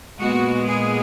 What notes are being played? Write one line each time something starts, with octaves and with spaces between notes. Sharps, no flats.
A#2 G#3 B3 F#4
G#4